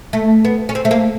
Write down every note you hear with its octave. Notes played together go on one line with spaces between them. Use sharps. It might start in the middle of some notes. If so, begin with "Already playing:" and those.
A3
B3
C#4
C4
A3
A#3